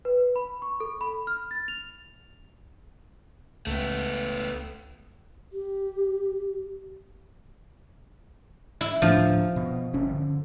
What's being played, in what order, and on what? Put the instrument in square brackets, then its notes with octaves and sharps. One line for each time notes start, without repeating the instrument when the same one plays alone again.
[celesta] B4
B5
C#6
A4
B5
F6
A6
F7
[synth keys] C#2 [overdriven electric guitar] A3 B3
[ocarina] G4
[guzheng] E4
[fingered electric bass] D1 A2 D4 [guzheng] F3
[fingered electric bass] B2
G1 C#4
D3